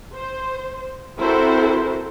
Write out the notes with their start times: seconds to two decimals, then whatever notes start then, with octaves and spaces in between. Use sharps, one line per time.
0.15 C5
1.20 C4 E4 F#4 A4 A#4 C5